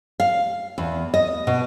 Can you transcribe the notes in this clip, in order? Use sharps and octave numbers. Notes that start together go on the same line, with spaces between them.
F5
E2
D#5
B2